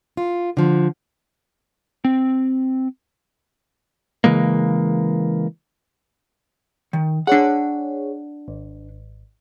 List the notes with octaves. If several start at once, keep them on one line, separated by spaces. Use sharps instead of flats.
F4
D3 F3
C4
C#3 E3 G#3 A#3
D#3
D4 G#4 C#5 F#5
G#1